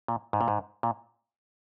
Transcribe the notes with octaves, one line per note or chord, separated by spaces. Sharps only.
A#2
G#2
A#2
G#2
A#2